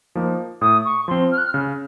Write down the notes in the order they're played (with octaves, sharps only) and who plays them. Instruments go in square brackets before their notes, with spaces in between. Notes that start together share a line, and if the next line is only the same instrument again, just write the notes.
[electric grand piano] F3 A#3 D#4
[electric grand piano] A2 [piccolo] D#6
[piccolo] C#6
[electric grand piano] F3 C4 [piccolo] C6
[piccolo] F6
F#6
F6
[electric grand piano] C#3